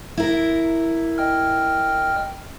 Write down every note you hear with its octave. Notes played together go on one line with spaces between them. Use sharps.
E4 A#4
D#5 G5 F6